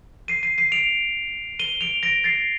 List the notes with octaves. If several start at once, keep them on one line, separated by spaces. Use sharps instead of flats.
C7 D#7
C7 D#7
C7 D#7
D7 F7
D#7 G7
D7 F7
A#6 D7
A6 C7